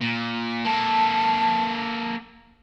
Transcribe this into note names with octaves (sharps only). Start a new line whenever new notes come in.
A#2
A#3 A4 A5